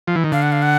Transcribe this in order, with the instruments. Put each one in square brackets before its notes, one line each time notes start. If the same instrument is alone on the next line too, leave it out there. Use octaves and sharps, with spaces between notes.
[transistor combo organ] F3
E3
D#3
[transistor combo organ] D3 [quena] F5
[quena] F#5
F5
F#5